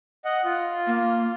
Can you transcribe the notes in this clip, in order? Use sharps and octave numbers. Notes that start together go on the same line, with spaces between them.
D#5 F#5
F4
A#3